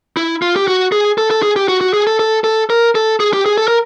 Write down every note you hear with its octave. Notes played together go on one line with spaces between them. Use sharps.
E4
F4
G4
F#4
G#4
A4
A4
G#4
G4
F#4
F#4
G#4
A4
A4
A4
A#4
A4
G#4
G4
G#4
A4
A#4